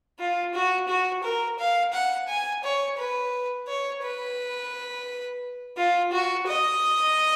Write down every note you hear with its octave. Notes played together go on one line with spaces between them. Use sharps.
F4
F#4
F#4
A#4
F5
F#5
G#5
C#5
B4
C#5
B4
F4
F#4
D#5